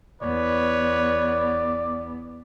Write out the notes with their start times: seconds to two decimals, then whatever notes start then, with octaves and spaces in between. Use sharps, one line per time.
0.22 E2 B3 B4 C#5 D5